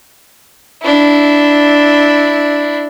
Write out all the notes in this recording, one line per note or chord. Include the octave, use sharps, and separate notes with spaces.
D4 E4